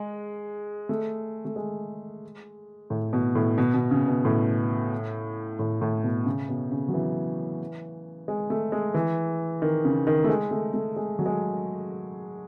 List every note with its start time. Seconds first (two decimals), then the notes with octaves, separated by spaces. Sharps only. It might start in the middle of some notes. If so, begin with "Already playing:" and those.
Already playing: G#3
0.89 A3
1.45 A3
1.56 G#3
2.90 A2
3.13 B2
3.35 A2
3.58 B2
3.74 B2
3.91 C#3
4.08 B2
4.25 A2
5.59 A2
5.81 A2
6.04 B2
6.26 C#3
6.48 B2
6.72 C#3
6.88 F#3
6.94 E3
8.28 G#3
8.50 A3
8.72 G#3
8.94 E3
9.62 D#3
9.85 C#3
10.07 D#3
10.24 A3
10.29 G#3
10.51 A3
10.74 A3
10.96 G#3
11.19 F#3
11.26 G#3